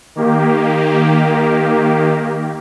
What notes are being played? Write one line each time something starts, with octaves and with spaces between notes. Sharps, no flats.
D#3 A#3 G4